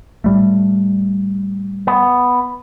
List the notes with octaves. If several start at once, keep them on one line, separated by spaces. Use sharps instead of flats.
A2 G3 A3
B3